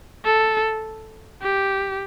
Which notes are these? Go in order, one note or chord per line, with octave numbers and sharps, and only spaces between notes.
A4
G4